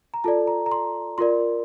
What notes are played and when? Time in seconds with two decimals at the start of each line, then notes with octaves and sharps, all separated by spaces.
0.14 A#5
0.24 F4 A4 D5 A5
0.47 A#5
0.66 A#5
0.72 C6
1.18 F4 A#4 D5 C6